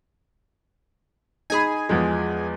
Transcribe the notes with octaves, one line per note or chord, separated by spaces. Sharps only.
D#4 G#4 G#5 B5
E2 F3 G#3